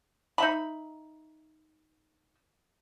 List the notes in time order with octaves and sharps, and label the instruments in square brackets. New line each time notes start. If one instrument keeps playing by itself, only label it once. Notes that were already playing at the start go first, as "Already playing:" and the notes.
[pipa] D#4 E5 B5